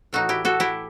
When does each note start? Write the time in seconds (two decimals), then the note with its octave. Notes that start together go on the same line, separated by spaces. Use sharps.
0.13 A2 E3 A3 D#4 F#4
0.29 E4 G4
0.45 F#4 A4
0.60 E4 G4